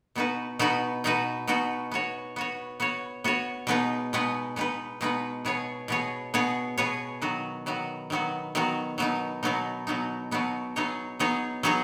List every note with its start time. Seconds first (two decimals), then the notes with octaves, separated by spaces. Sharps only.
0.15 B2 B3 D#4 F#4 B4
0.59 B2 B3 D#4 F#4 B4
1.04 B2 B3 D#4 F#4 B4
1.47 B2 B3 D#4 F#4 B4
1.92 B3 F#4 C#5
2.36 B3 F#4 C#5
2.80 B3 F#4 C#5
3.24 B3 F#4 C#5
3.67 B2 G#3 B3 D#4 B4
4.13 B2 G#3 B3 D#4 B4
4.56 B2 G#3 B3 D#4 B4
5.01 B2 G#3 B3 D#4 B4
5.45 B2 B3 G#4 C#5
5.88 B2 B3 G#4 C#5
6.34 B2 B3 G#4 C#5
6.78 B2 B3 G#4 C#5
7.22 D#3 F#3 B3 F#4
7.66 D#3 F#3 B3 F#4
8.10 D#3 F#3 B3 F#4
8.55 D#3 F#3 B3 F#4
8.98 B2 F#3 B3 D#4
9.43 B2 F#3 B3 D#4
9.87 B2 F#3 B3 D#4
10.31 B2 F#3 B3 D#4
10.76 F#3 B3 D#4 G#4 C#5
11.19 F#3 B3 D#4 G#4 C#5
11.63 F#3 B3 D#4 G#4 C#5